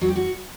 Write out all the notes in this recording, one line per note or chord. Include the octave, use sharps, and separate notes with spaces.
F#3
G4
F#4